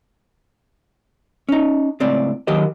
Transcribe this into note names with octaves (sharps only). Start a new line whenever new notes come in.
C#4 D#4
C#2 A2 C4 D5
D#3 F#3 G4 A#4 D#5